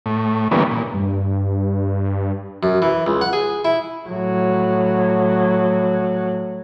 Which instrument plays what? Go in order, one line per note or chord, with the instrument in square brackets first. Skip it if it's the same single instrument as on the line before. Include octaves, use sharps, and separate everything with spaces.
[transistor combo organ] A2
D3 E3 G3 A#3 B3 C#4
A#2
[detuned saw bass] G2
[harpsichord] F#2
E3
C#2
F#5
G#4
E4
[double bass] A2 F#3